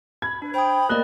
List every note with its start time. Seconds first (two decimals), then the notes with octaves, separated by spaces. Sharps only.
0.22 B5 G#6
0.42 D4 B4
0.54 C5 G5 B5 D#6
0.89 A3 A#3 D5 D#5 F#6